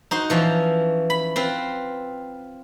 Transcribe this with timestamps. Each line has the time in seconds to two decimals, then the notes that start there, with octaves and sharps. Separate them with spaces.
0.11 D#4 F#4 C5
0.30 E3 F3 C#4
1.10 B5
1.36 C4 F4 B4